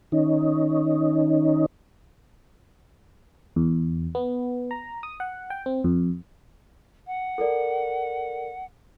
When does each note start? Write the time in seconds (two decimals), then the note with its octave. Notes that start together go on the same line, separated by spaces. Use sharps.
0.12 D#3 C#4 D#4
3.56 E2
4.15 B3
4.71 A#5
5.03 D#6
5.20 F#5
5.50 G5
5.66 C4
5.84 F2
7.07 F#5
7.38 A4 A#4 D5